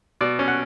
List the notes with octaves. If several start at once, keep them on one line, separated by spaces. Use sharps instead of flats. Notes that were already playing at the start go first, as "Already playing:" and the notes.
B2 D5
C#4
F#5